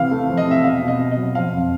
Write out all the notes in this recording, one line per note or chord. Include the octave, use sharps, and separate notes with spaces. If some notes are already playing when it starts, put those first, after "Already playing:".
Already playing: C3 E3 F5
A3
F3
D#5
C3 E5
B2 F5
B2
D#5
B2
F#3 D#5
F3 F5
F2